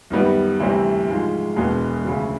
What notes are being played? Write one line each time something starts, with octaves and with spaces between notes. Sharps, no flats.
F#2 D#3 G3 B3
D2 C3 E3 G3 C4
G#2 F3 G#3
E1 E2 B2 G#3 B3
D2 C#3 F#3